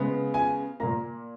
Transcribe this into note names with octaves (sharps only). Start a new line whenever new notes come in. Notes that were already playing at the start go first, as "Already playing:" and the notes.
Already playing: C#3 G#3 B3
G#5
A#2 A#3 A#5